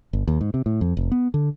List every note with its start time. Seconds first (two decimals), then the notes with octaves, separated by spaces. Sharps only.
0.13 G1
0.27 D#2
0.41 G#2
0.54 C3
0.66 A2
0.81 F2
0.97 F1
1.12 B3
1.34 D3